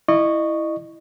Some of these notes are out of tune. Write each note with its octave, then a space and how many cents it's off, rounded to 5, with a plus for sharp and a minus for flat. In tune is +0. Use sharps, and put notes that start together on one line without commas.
E4 +0 D#5 -30 C#6 +0